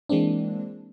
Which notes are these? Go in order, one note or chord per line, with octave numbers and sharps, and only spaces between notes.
E3 G#3 A#3 C4 D4